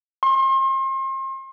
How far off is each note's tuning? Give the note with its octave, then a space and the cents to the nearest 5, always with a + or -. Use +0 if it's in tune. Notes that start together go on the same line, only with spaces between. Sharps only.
C6 +40